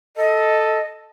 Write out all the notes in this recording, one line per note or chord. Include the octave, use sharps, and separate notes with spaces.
A4 D#5